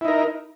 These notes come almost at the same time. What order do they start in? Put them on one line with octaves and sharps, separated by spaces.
E4 D#4 A#4